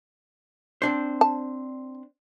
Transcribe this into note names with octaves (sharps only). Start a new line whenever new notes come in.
C4 D4 C5
A5